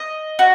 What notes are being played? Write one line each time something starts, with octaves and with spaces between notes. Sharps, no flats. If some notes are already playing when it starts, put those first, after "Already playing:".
Already playing: D#5
F#4